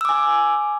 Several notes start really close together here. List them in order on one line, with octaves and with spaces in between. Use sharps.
E6 D6 G#5